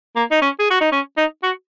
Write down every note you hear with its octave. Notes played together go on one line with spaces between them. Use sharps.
A#3
D#4
C#4
G#4
F#4
D#4
C#4
D#4
F#4